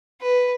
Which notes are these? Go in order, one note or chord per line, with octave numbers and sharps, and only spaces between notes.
B4